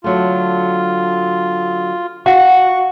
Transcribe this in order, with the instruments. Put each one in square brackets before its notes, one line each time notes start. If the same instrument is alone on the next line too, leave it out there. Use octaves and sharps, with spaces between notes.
[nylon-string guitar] D3 F#3 A3 [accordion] F4
[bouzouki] F#4 [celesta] F5 F#5 [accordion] C#6